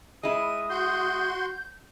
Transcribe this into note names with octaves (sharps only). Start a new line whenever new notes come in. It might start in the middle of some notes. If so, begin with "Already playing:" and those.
G#3 E4 D#6 D#7
F#4 C6 G6